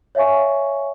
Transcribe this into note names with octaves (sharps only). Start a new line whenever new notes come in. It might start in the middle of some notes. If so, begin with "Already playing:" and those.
C#5 E5 F5 G#5 C#6